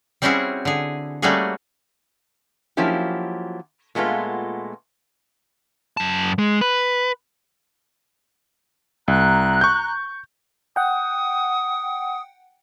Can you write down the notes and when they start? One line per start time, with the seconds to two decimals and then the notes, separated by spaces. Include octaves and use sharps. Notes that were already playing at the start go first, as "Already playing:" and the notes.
0.22 G3 C4 C#4 E4 F#4 G#4
0.65 D3 G#4
1.22 G3 A3 A#3 C#4 F#4 G#4
2.77 F3 F#3 A#3 C#4 E4 G4
3.95 A#2 G#3 A3 B3 F4
5.97 F#2 A5
6.39 G#3
6.61 B4
9.08 C2 A#5 F#6
9.61 C#6 G6
10.76 F#5 G5 D#6